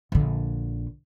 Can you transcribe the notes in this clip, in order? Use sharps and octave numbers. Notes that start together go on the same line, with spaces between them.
A#1 D3